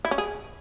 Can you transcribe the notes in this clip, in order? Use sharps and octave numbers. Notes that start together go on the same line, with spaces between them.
E4
C#4
G#4